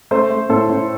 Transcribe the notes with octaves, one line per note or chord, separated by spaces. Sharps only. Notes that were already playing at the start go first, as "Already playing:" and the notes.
A3 C5
A3
A2 A4
A2